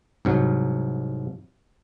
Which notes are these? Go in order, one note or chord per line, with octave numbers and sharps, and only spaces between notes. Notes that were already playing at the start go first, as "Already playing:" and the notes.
C2 G#2 F#3